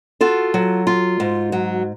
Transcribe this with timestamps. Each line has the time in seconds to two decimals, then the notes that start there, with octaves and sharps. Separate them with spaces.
0.21 F4 F#4 A4
0.54 F#3
0.87 F4
1.20 G#2
1.52 F#3